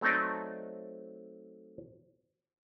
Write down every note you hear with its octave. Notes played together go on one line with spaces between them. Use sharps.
F#3 A3 C4 D#4 D5